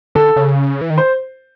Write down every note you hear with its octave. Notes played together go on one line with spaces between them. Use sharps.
D3 A4
C#3
E3
D#3
C5